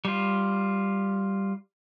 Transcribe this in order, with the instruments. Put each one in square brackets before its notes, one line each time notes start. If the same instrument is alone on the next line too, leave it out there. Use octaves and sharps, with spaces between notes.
[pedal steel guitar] G3 F4